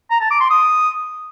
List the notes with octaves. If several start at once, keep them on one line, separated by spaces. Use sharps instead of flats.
A#5
A5
D6
C6
D#6